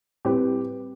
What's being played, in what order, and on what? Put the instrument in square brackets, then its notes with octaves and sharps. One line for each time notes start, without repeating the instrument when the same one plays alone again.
[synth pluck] A2 G3 C4 E4 B4 [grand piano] G4